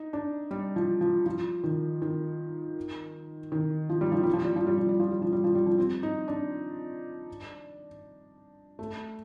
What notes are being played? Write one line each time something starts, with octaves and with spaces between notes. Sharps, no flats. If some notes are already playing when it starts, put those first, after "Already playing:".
Already playing: D#4
D4
G3
F3
F3
F3
D#3
D#3
D#3
F3
G3
F3
G3
F3
G3
F3
G3
F3
G3
F3
G3
F3
G3
F3
G3
F3
C4
D#4
D4
A3